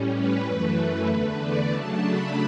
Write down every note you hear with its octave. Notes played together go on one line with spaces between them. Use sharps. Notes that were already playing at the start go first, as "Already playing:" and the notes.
Already playing: A2 G3 C#4
B4
F#2 E3 A3
B4
E2 D3 A3 B4
D5
C#3 F#3 A3 D4 A5
B5